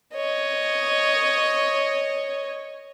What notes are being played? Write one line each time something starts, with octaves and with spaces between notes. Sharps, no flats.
C#5 D#5